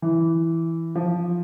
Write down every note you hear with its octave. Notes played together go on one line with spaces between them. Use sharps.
E3
F3